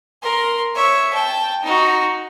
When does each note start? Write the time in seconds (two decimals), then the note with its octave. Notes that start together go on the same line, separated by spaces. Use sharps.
0.23 A#4 C6
0.75 C#5 E5
1.13 G5 A5
1.63 D#4 F#4